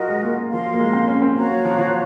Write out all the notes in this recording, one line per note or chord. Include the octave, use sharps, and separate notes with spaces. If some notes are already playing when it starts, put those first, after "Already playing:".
Already playing: F#3 F4 F#4 A#4 D#5
G#3
A#3
A#3
F3 A#4 F5 C6
F#3
A#3
G#3
C4
C#4
C4
A#3 F#4 C#5 F5 A#5
F#3
F3
F3